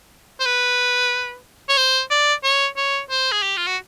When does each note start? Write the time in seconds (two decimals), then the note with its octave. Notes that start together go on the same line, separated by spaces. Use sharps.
0.40 C5
0.45 B4
1.69 C#5
1.77 C5
2.11 D5
2.44 C#5
2.77 C#5
3.10 C5
3.32 G#4
3.43 G4
3.57 F4
3.67 F#4